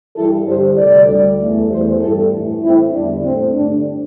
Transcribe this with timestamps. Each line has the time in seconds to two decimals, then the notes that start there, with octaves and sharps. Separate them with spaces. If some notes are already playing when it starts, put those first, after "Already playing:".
0.16 G2 E3 G3 E4 A4
0.47 G2 D3 G3 G4 C5
0.78 D2 C3 G3 A4 D5
1.08 D2 D3 G3
1.40 E2 E3 A3
1.70 E2 E3 A3 G4 C5
2.00 G2 G3 E4 A4
2.31 A2 E3 A3
2.62 A2 A3 C4 E4
2.93 E2 D3 G3 D4
3.23 A2 A3 C4
3.54 G2 D3 A3 D4